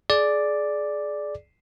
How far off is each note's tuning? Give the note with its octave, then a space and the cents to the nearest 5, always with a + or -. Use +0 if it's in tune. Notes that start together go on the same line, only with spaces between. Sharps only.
G#4 +25 D5 +0